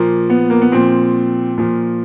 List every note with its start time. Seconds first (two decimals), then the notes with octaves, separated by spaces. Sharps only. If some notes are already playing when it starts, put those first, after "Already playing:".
Already playing: A#2 F3 A#3
0.30 B3
0.50 A#3
0.61 B3
0.72 A#2 F3 C4
1.58 A#2 F3